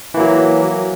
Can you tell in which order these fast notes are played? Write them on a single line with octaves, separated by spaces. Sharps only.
E3 A#3 F#3